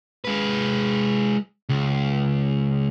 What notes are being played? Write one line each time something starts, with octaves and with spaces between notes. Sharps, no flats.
G#3 B4
C#2